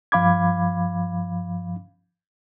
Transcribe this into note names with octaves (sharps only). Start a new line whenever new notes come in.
G2 F3 F5 B5 D6 G#6